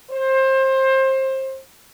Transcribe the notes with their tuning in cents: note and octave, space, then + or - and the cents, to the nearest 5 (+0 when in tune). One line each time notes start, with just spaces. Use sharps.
C5 +25